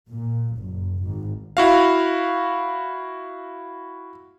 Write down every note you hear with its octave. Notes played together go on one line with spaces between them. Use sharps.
A#2
F#1
G#1
E4 F#4 F5